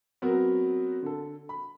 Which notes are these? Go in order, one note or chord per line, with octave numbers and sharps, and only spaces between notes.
F#3 B3 C4 F#4 A#4
D3 A4
B5